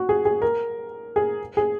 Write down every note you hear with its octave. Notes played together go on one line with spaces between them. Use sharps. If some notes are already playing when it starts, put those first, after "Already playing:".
Already playing: F#4
G#4
G#4
A#4
G#4
G#4